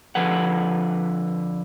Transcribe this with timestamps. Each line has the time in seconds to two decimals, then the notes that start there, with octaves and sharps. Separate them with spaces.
0.15 D3 F3 B4 F#5